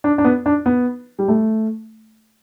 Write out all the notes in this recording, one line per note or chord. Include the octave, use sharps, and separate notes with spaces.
D4
D4
B3
D4
B3
G3
A3